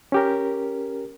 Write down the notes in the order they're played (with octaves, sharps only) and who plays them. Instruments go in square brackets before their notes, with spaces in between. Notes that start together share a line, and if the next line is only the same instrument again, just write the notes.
[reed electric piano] C#4 G4 A#4